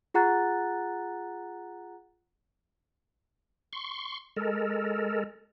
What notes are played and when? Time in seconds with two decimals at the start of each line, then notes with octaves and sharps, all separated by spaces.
0.14 F4 G#4 F#5 A#5 F#6 A6
3.73 C6 C#6
4.36 G#3 A4 A#4